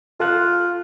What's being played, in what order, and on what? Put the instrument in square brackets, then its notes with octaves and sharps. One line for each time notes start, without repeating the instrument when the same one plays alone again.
[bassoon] F4 [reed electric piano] A4 F5 F#6